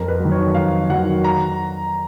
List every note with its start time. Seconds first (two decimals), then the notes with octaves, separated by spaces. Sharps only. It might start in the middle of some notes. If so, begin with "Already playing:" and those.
Already playing: F2 A#4
0.08 B4
0.20 F#3
0.25 D#3
0.31 C#5
0.55 F2 F5
0.89 D#3 F#3 F#5
1.24 A#5